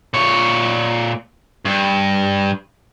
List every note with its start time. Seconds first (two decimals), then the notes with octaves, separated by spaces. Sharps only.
0.14 A#2 C#5
1.65 G2